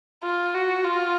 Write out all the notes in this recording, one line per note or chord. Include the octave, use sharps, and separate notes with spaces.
F4
F#4
F4